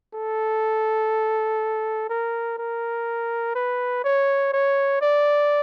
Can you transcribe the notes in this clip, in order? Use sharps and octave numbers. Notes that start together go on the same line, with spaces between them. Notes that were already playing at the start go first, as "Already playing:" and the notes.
A4
A#4
A#4
B4
C#5
C#5
D5